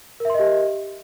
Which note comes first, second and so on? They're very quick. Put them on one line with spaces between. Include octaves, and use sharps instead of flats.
A#4 E5 C6 D#5 G4